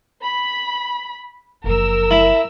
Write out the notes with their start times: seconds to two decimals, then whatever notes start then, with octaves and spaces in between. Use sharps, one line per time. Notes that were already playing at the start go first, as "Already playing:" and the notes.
0.23 B5
1.64 F#1 F3 A#4 E6
2.11 E4